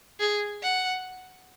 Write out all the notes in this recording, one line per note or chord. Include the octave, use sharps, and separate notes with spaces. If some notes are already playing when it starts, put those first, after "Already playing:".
G#4
F#5